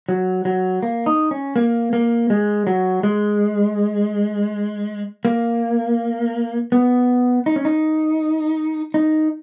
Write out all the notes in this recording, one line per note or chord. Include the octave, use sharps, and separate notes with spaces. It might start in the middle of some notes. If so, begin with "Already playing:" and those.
F#3
F#3
A#3
D#4
C#4
A#3
A#3
G#3
F#3
G#3
A#3
B3
D#4
C#4
D#4
D#4